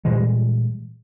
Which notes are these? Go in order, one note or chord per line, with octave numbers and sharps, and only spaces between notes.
A#2 E3 G3 G#3